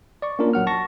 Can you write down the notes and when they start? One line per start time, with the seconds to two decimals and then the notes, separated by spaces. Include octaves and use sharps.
0.22 D5 C#6
0.39 A#3 C#4 D4 F4 A#4
0.53 A#1 F#3 F#5 F6
0.67 A5 C#6 A#6